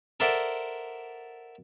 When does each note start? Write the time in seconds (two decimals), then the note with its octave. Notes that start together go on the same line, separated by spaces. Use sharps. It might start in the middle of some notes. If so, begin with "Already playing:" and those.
0.20 A4 A#4 C5 D5 E5 F#5